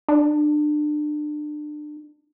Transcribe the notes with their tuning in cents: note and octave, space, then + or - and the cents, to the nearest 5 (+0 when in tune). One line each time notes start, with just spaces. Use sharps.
D4 +30